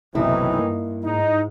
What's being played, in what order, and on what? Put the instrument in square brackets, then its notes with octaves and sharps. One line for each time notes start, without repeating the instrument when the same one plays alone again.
[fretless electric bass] F#1 B1 [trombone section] A2 D#3 E3 [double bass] C3 D#4 [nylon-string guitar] E4
[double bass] G2 [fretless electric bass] A#3
[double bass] G#2 [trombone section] D#4